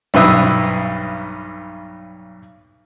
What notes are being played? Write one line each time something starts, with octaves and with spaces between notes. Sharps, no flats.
B1 G2 B2 B4 E5 D#6